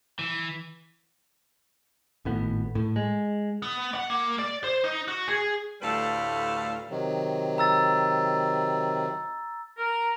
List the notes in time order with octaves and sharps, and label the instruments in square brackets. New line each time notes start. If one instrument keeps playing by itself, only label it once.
[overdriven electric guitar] E3
[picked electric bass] G#1 A2 B3
A2
G#3
[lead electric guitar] B3
F#5
A#3
D5
C5
D#4
F#4
G#4
[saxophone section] D2 A2 G3 A4 B4 F5
[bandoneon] C3 D#3 F#3
[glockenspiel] A#5 E6 A6
[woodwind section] A#4